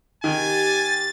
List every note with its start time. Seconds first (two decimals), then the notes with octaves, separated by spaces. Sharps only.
0.24 D#3 G4 G#5 A6